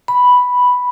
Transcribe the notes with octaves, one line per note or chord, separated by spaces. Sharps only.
B5